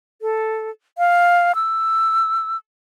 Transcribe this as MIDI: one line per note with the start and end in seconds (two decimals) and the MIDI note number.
0.22 0.70 69
0.98 1.55 77
1.55 2.57 88